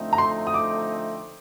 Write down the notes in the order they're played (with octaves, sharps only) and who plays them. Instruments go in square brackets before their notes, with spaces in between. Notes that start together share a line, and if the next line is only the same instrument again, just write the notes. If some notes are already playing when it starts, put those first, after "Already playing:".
Already playing: [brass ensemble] F2 D3 A3 C4 D#4
[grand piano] A#5
C6
D#6
D6